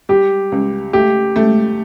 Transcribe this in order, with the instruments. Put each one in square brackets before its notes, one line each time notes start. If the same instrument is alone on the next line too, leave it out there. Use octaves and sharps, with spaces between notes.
[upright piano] G3 [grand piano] G4
[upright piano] C#2
[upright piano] A3 [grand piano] G4
[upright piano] A3